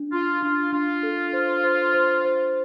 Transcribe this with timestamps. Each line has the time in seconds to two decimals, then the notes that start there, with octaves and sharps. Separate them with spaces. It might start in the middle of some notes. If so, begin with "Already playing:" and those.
Already playing: D4
0.12 D4 F4
0.42 D4 F4
0.72 D4 F4
1.03 A4
1.33 C5
1.64 C5
1.94 C5
2.25 C5